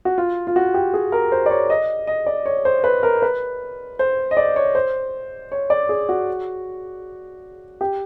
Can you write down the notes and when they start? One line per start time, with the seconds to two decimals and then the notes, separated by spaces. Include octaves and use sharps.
0.05 F#4
0.18 F4
0.47 F4
0.56 F#4
0.74 G4
0.94 G#4
1.12 A#4
1.32 C5
1.46 D5
1.51 C#5
1.70 D#5
2.07 D#5
2.26 D5
2.46 C#5
2.65 C5
2.84 B4
3.03 A#4
3.22 B4
3.99 C5
4.31 D#5
4.37 D5
4.56 C#5
4.75 C5
5.52 C#5
5.70 D5
5.89 G#4
6.09 F#4
7.81 G4